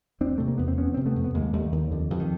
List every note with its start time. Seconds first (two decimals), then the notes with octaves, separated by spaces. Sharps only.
0.20 E2 C4 D4
0.38 C3 A3
0.48 A#3
0.58 E2 B3
0.68 C4
0.78 F2 B3 C#4
0.94 C3 C4
1.06 A3 B3
1.16 F2
1.24 B3
1.34 D#2 G#3 A#3
1.53 D#2 G3 A3
1.72 D#2 D#3
1.91 F2 D3
2.11 F2 E3
2.20 D#3